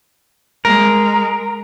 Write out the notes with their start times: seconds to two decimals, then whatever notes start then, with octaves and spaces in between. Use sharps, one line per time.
0.65 G#3 A#4